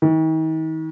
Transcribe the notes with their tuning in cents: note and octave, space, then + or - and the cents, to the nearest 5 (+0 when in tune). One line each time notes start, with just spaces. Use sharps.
D#3 +40